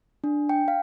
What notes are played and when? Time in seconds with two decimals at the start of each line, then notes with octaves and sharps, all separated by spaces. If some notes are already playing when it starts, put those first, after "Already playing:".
0.24 D4
0.49 G5
0.68 F5